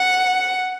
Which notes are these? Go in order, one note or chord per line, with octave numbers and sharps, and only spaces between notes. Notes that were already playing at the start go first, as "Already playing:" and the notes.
Already playing: F#5